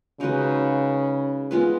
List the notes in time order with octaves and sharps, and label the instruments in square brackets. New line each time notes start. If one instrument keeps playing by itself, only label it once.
[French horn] C#3 [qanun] G#3 D#4 F#4 B4
[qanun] G#3 B3 F4 B4